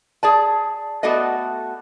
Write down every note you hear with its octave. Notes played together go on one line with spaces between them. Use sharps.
G#4 D5 A5
A3 B3 F#4 A4 D5 D#5